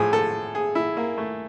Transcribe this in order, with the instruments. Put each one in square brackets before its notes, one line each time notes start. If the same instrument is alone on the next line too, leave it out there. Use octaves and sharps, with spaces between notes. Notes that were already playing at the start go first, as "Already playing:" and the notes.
Already playing: [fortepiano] A2 F3 G#4
A4
G#4
E4
A#3
A3